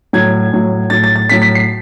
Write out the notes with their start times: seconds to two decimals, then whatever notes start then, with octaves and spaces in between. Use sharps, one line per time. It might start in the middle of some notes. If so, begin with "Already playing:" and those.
0.13 A2 F#3 G#6
0.52 A2 F#3
0.90 A2 F#3 A6
1.04 A6
1.16 A6
1.29 A2 F#3 B6
1.42 B6
1.55 C7